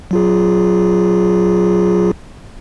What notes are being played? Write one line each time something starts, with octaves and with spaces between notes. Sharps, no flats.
F#3 F4 G#4